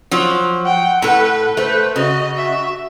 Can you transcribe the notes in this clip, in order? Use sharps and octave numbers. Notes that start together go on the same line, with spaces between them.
F3 F#3
F#5 G5
A2 A4 B4
A3 B4 C5
C#3 F#4 D#5
E5